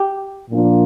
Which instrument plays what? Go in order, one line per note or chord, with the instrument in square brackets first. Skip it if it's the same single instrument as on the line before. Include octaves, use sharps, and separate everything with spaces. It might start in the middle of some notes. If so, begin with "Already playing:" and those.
Already playing: [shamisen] G4
[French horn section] A#2 F3 A#3 D4 F4